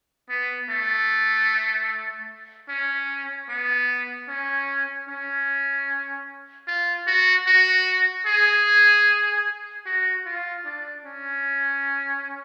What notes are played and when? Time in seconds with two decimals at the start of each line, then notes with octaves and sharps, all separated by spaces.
0.30 B3
0.70 A3
2.69 C#4
3.49 B3
4.28 C#4
5.09 C#4
6.68 F4
7.07 F#4
7.47 F#4
8.27 G#4
9.86 F#4
10.26 F4
10.66 D4
11.06 C#4